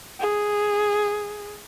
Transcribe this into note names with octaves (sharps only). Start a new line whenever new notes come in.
G#4